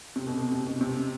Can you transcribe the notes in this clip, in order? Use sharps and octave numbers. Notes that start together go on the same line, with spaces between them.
C3
B2
B2
C3
B2
C3